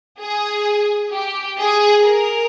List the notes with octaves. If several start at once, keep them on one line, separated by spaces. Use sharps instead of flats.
G#4
G4
G#4
A#4